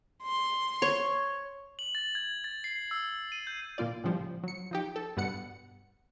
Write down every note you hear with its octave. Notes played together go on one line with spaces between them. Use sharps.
C6
C#5 C#6
F#7
A6
G#6
A6
C7
E6
D#7
G6
A#2 A#3 F4 D5
A2 C#3 F3 G3
F#3 C#7
F3 D#4 G4
A4
G2 B2 B3 F#5 C#7